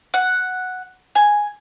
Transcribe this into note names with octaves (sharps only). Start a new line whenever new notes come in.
F#5
G#5